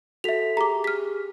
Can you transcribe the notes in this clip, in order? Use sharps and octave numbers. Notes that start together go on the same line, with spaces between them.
F#4 A4 E5 B6 F7
G4 G#4 A#5 D6
F6 B6